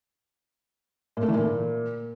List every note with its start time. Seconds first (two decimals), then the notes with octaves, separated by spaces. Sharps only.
1.17 A#2
1.22 A3
1.28 E3
1.34 A#2